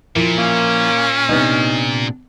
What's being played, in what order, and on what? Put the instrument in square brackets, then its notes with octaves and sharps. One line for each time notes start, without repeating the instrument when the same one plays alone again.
[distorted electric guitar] A#2 [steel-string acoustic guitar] F3 E4 A#4
[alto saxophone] A#3 [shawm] C#4
[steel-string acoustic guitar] C3 B3 D4 [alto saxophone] D#4